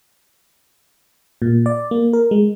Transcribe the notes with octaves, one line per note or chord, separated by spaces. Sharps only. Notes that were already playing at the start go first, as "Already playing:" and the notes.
A#2
D5
A#3
A#4
G#3